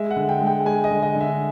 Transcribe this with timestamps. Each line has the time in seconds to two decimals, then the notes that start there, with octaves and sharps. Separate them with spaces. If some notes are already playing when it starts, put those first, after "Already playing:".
Already playing: G#3 E5
0.11 F#5
0.16 D3
0.29 G5
0.41 G#3
0.47 G5
0.65 G#3 G#5
0.84 D#5
0.91 D3
1.02 D#5
1.15 D3
1.20 E5